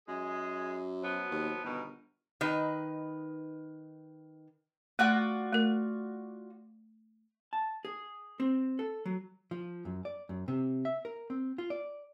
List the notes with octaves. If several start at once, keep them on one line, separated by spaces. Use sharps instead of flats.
F#2 G#3 G#4
F3 F#3 B3
D#2
G1 B2 D#3
D#3 D#4 B4
A3 F4 F#4 D5
A3 A#4
A5
G#4
C4
A4
F#3
F3
F#2
D5
F#2
C3
E5
A#4
C4
F4
D5